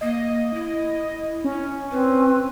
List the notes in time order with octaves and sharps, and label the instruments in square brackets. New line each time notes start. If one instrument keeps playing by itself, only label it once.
[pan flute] A#3 [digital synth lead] D#5
[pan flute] E4
[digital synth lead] C#4
[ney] C4 [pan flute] B4